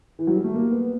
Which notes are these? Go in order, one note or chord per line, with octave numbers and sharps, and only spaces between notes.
E3
F#3
G3
A3
A#3
B3